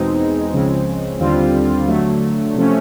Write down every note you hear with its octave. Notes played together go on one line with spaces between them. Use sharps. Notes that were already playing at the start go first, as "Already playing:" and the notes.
Already playing: E2 B2 G#3 C4 D#4
C#2 C#3 F3 G#3 C4
D#2 D3 G3 C4 F4
D3 F#3 A3
C3 F3 A3 C#4